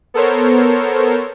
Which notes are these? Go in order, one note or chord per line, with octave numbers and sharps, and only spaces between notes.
B3 A4 A#4 C5 C#5